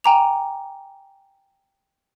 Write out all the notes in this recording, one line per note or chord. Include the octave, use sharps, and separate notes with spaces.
G5 G#5 A#5 D6 F7